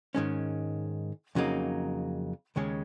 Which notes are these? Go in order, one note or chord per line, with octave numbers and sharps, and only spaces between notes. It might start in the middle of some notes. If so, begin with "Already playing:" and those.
G#2 D#3 G#3 C#4
F2 C#3 F#3 A#3 D#4
D#2 C#3 G#3 C#4